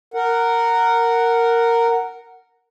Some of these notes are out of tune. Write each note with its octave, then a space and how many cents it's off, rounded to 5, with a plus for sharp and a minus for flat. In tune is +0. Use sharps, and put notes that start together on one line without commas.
A#4 -10 F#5 +0